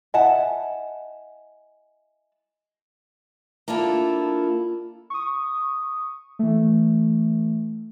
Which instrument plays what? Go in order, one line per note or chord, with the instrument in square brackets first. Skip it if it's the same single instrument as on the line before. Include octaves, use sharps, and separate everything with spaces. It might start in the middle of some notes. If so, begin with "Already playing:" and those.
[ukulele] E4 F#5 A5 [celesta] D#5 G#5
[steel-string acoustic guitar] A#3 D4 E4 F4 A4
[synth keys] C#6 D#6
E3 A3